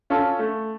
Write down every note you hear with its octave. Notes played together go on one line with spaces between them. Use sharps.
C#4 F4 A4
A3